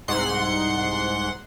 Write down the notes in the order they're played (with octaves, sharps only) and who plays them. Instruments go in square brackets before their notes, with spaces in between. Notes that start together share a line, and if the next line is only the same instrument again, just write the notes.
[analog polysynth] C2 G#2 F#5 C6